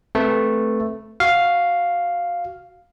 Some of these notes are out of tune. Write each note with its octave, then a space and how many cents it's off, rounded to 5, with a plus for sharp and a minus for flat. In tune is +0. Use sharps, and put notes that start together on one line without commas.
A3 +0 C4 +0 B4 +0
F#4 +0 F5 +0